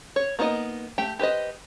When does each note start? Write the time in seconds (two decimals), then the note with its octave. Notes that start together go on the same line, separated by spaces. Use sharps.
0.16 C#5
0.39 A#3 B3 D#4 B4 D#5
0.98 A3 G4 G5
1.19 G4 B4 C5 D#5